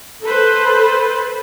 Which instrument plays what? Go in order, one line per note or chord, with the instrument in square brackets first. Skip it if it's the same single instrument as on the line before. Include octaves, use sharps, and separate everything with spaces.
[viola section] A4 B4 C5